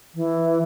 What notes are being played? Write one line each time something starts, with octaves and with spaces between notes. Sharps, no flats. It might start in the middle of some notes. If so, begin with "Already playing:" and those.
E3